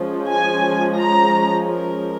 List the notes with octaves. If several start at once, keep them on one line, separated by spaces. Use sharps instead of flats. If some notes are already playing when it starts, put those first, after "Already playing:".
Already playing: F3 G#3 C#4
G#5
A#5
A#4